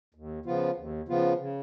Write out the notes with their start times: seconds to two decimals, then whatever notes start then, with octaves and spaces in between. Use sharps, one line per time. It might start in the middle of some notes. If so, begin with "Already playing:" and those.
0.15 D#2
0.46 C#3 F3 B3 F4
0.77 D#2
1.08 C#3 F3 B3 F4
1.40 C#3